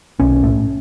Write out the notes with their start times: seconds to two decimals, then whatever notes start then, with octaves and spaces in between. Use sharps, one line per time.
0.20 B1 C#4
0.44 A2